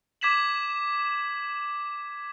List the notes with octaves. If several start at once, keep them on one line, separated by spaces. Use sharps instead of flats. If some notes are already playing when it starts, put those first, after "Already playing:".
D6 G#6 B6 E7 F#7